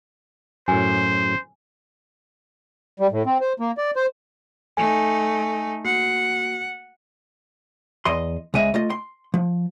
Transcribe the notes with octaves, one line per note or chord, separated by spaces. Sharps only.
F#2 A2 C5 G#5
G3
A2
C4
C5
A#3
D5
C5
A3 D#4 A4 G#5
A#3 F#4 F#5 C7
E2 D#5 C6
C#2 G#3 D#5 E5
A3 F4 D#5
C6
F3